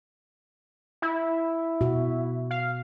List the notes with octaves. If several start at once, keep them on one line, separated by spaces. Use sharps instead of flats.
E4
B2 F#4
F5